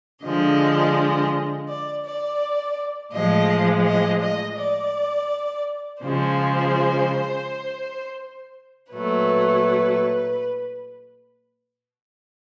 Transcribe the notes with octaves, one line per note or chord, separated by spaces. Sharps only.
D3 F3 G#3 D#5
D5
D5
A2 F3 G#3 D#5
D#5
D#5
D5
C#3 F3 G#3 C5
A#2 F#3 A3 B4